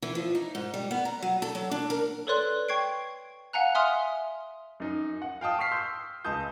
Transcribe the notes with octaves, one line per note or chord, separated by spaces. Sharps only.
E3
F3
D#4
G#2
G3
B3
A#5
F#3
A4
F#3
D4
A#4
A4 B4 C#5 D5 C6 F#6
G5 C#6 G#6 C7 D7
F5 F#5 G#5 A#5 F#6
E5 G#5 C6 D#6 F6
F#2 D#4
F#5
F5 G5 A5 D#6
C#6 F6 B6 C7
C6 E6 G6
C#2 D#5 A5 D#6 G6